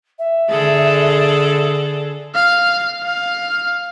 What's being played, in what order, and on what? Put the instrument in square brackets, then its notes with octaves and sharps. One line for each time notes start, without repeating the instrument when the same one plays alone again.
[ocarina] E5
[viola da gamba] D3 G#4 A4
[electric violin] F5
F5